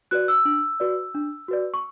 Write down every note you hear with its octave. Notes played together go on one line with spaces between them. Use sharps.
F#4 B4 D5 F#6
E6
D4
F#4 B4 D5
D4
F#4 B4 D5
C#6